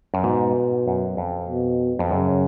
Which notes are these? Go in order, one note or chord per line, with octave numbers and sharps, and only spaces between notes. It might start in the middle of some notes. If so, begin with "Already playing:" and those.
F#2
G#2 B2
F#2
F2
B2
F2
F#2 C#3